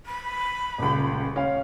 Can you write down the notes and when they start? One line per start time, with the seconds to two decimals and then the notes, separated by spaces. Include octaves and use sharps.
0.06 B5
0.78 D#1 C#2
1.36 C#4 F5